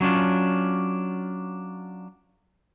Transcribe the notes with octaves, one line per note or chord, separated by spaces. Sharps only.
F#3 C#4 D4 F4